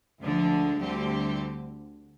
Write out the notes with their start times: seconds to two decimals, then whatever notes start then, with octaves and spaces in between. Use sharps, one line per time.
0.21 D2 D3 F3 G#3 D4
0.81 D2 D3 G3 C4 G4